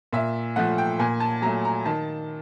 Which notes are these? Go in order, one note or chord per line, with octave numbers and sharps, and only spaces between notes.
A#2 E5
F3 A3 F#5
G5
A#2 G#5
A5
F#3 A3 A#5
A#5
D#3 A5